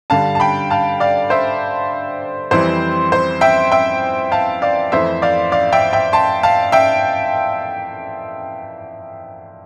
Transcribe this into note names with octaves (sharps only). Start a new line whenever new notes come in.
G2 D3 G3 F5 A5
A5
G5 B5
F5 A5
D5 F5
C5 E5
F2 E3 G3 C4 E4 C5
C5
E5 G5
E5 G5
F5 A5
D5 F5
F2 E3 A3 E4 C5 E5
D5 F5
D5 F5
E5 G5
E5 G5
A5 C6
F5 A5
E5 G5